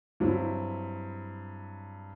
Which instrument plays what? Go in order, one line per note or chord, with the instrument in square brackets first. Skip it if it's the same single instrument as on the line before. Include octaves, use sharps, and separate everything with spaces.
[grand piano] G2 F#3 C4 E4